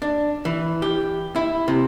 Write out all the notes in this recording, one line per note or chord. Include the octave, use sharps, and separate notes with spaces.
D4
E3
G4
E4
C3